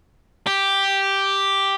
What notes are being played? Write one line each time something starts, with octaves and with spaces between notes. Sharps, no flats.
G4